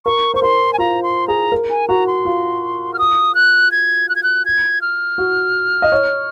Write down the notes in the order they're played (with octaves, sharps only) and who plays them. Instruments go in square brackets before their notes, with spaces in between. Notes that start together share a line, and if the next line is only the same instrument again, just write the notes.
[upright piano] A#4 [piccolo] C#6
[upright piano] C5 [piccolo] C#6
[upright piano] A#4 [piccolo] C6
[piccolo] G#5
[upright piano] F4 [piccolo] A#5
[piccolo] C6
[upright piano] G#4 [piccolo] A#5
[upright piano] A#4
[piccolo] G#5
[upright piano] F#4 [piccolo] A#5
[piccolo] C6
[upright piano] F4
[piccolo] F6
D#6
F#6
G#6
F#6
G#6
F#6
G#6
F6
[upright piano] F#4
D#5
C#5